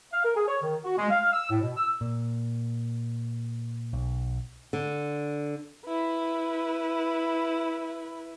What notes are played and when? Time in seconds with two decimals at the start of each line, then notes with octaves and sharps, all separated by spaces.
0.12 F5
0.24 A#4
0.36 G#4
0.48 C#5
0.61 D#3
0.84 F#4
0.97 G#3
1.10 F5
1.32 E6
1.50 A2
1.62 B2
1.77 E6
2.01 A#2
3.93 B1
4.73 D3
5.85 E4 B4